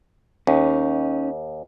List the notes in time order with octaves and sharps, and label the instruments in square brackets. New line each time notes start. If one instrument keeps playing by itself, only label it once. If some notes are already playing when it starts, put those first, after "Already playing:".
[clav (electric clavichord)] D#2 [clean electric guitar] C#4 D#4